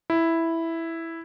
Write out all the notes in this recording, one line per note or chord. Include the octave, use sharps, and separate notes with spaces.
E4